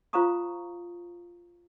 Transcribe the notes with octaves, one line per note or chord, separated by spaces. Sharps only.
F4 C5 F5 A#5 C#6 D#6